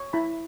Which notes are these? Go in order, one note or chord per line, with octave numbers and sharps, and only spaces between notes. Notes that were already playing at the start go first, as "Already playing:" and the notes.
Already playing: C#5
E4 B5